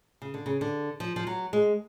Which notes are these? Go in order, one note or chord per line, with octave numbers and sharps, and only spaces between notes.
C#3
D3
C#3
D3
F3
F3
F#3
G#3